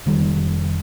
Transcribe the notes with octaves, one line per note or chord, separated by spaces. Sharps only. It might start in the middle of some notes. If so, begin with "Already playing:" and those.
F1 D#3 G3